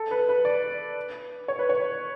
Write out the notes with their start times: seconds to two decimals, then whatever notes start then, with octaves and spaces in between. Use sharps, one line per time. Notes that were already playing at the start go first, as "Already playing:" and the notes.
Already playing: A4
0.11 B4
0.29 B4
0.45 D5
1.48 C#5
1.59 B4
1.69 C#5